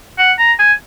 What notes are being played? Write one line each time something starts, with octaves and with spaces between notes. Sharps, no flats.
F#5
A#5
G#5